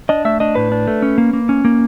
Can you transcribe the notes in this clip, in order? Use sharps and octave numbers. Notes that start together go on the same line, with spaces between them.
D4 D#5
A3 E5
D4 D#5
A2 B4
D4
A3
C#4
A#3
A#3
C#4
A#3